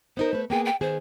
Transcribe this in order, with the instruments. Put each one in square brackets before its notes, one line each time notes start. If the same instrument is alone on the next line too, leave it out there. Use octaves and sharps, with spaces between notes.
[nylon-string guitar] B3 D#4 A#4 [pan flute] C5
[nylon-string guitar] A3 B4
[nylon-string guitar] A#3 B3 G#4 [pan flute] G5
[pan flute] G5
[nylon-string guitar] D#3 B3 G#4 [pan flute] C5